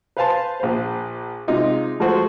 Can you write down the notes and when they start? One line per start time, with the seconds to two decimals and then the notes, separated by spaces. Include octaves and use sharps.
0.17 B4 C5 F5 G#5 A5 C6
0.60 A#1 C5
1.48 C3 G#3 D#4 F4
2.00 F3 G#3 A3 F#4 C5